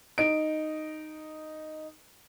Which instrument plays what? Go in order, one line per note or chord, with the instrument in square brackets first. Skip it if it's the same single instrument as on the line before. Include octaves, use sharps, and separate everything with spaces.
[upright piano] D#4 D7